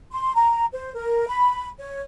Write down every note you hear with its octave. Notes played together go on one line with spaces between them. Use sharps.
C6
A#5
C5
A#4
B5
C#5